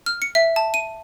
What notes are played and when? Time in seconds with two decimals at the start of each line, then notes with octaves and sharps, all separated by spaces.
0.06 F6
0.22 C#7
0.35 E5
0.56 A5
0.74 D#7